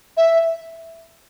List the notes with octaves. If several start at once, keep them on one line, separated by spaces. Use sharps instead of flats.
E5